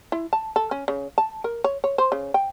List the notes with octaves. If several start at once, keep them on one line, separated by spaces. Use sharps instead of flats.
E4
A5
A4
C#4
C#3
A5
A#4
C#5
C#5
C5
C#3
G5